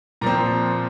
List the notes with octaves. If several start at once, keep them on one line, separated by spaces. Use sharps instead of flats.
A#2 F3 C4 A#5